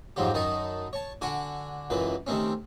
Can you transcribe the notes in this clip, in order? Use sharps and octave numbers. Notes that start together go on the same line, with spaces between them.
F2 G#2 F3 F#3 G4
F#2 D#3 D#4 A5 C#6 D#6
C#5 A5
D3 F#4 G#5 C#6 D6
C#2 F#2 E3 B4
C3 D#3 A3 C4 C#4